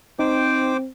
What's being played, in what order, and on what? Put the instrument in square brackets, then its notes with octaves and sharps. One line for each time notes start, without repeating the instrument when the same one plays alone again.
[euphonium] C4 [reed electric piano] D#4 [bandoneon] C5 G5 D6